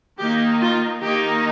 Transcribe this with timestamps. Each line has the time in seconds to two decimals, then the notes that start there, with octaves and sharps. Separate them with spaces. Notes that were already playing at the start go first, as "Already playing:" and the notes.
0.19 D#3 A#3 D#4 G4
0.61 F4
1.03 D#3 A#3 D#4 G4